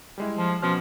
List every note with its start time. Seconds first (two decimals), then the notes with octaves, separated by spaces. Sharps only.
0.18 G3 G#3 E4
0.38 F3
0.62 B2 F3 C#4 F6